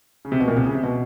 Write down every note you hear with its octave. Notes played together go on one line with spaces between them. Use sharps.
C#3
C3
B2
A#2
C3
C#3
C3
B2